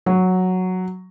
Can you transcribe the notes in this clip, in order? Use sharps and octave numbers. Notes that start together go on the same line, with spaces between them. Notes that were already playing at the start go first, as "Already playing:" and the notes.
F#3